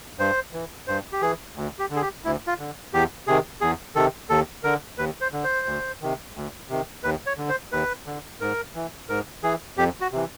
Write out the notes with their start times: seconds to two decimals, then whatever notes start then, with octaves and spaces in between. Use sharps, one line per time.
0.19 G2 C5
0.53 E3
0.87 G2 C5
1.13 G4
1.21 E3 G#4
1.56 D2
1.79 G4
1.90 D3
1.96 G#4
2.02 G4
2.24 D2 E4
2.47 F4
2.59 D3
2.93 E2 G4
3.27 C3 D#3 G#4
3.61 E2 G#4
3.95 C3 D#3 A4
4.30 D#2 A4
4.64 D3 A#4
4.98 D#2 B4
5.21 C5
5.32 D3
5.44 C5
5.67 D2
6.01 C3 D#3
6.36 D2
6.69 C3 D#3
7.03 D#2 B4
7.27 C#5
7.38 D3
7.49 C5
7.72 D#2 B4
8.07 D3
8.41 G#2 A#4
8.75 E3
9.09 G#2 A#4
9.43 E3 G#4
9.77 F2 G4
10.01 F#4
10.12 C3 E3